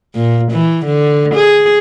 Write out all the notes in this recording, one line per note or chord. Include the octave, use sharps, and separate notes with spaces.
A#2
E3
D3
G#4